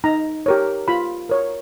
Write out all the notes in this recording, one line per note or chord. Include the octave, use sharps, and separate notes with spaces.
D#4 A#5
G4 A#4 C#5
F4 B5
A#4 C#5